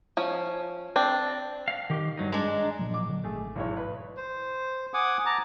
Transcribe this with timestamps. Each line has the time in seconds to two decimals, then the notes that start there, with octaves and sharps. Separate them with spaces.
0.17 F3 C#4
0.96 C4 D4
1.68 F5
1.90 D#3 G4
2.17 G2 F#3 D#4
2.32 G#3 D4 A#5
2.79 A#2 F3 F#3
2.94 D6
3.09 D3 F#3
3.23 G#1 A3 G#4
3.56 B1 E2 C#5
3.77 B4
4.17 C5
4.94 F#5 G#5 D6 D#6
5.26 A5 A#5 D6